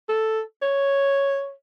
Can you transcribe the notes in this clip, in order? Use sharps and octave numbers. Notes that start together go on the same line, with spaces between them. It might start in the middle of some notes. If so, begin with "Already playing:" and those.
A4
C#5